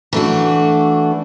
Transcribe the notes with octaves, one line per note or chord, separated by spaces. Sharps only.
E3 A3 D4 F#4